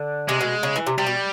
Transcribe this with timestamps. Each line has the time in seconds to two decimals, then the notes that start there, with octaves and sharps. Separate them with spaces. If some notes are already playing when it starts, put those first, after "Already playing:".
Already playing: D3
0.28 C3 G#3
0.41 B2
0.63 C#3
0.76 E3
0.87 C3
0.98 C3 G3
1.07 B2